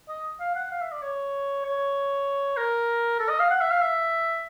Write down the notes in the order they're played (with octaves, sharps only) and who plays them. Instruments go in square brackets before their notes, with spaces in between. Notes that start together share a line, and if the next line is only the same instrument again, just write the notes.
[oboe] D#5
F5
F#5
F5
E5
D5
C#5
C#5
A#4
A4
D#5
F5
F#5
E5
F5
E5